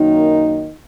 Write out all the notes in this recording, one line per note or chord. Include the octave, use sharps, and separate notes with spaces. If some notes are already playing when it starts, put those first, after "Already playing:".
Already playing: F#2 D#3 A#3 D#4